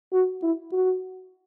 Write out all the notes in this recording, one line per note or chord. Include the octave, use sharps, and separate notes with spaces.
F#4
E4
F#4